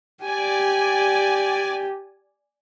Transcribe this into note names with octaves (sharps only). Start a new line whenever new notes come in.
G4 D5 G#5